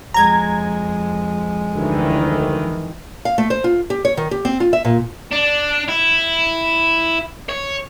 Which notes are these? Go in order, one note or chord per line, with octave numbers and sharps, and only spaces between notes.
F2 G#3 A#5 G#6
D2 D#3 E3
F5
A3
C5
F4
G4
C#5
D#3
G4
C4
F4
E5
A#2
D4
E4
C#5